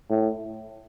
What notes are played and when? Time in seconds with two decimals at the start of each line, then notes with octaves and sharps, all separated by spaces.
0.10 A2